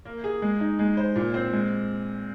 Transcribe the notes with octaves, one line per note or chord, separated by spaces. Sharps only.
A#3
G#4
G#3
D#4
G#3
C5
A#2
C4
G#3